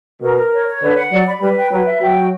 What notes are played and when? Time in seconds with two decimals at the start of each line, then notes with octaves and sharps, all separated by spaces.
0.21 B2 A#4
0.37 A#4
0.52 C#5
0.67 C#5
0.82 D3 B4
0.97 F#5
1.12 F#3 D5
1.27 B5
1.41 G3 B4
1.57 G5
1.71 F#3 B4
1.87 E5
2.01 F#3 G5
2.16 F#4